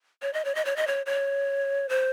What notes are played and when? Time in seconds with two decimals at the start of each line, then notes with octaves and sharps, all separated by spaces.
0.22 C#5
0.34 D#5
0.45 C#5
0.55 D#5
0.65 C#5
0.76 D#5
0.87 C#5
1.06 C#5
1.89 C5